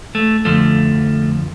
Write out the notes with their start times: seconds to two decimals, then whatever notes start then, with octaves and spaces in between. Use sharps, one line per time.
0.15 A3
0.45 F2 D3 F3 A3